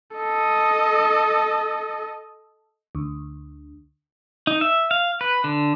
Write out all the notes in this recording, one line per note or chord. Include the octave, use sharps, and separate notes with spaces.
A4 D#5
D2
D#4
E5
F5
B4
D3